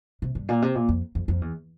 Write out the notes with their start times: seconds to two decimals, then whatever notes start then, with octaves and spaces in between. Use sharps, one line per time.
0.22 C3
0.35 G2
0.49 A#2
0.62 C3
0.75 A#2
0.89 F2
1.15 F2
1.28 F2
1.41 E2